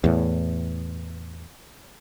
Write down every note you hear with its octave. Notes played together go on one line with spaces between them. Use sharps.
E2 A2